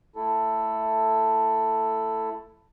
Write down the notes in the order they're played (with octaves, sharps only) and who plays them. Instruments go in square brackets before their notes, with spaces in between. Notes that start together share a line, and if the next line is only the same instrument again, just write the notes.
[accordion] A3 E4 A4